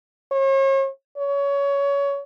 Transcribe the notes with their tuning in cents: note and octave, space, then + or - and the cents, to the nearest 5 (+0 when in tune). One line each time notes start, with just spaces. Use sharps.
C#5 -40
C#5 +20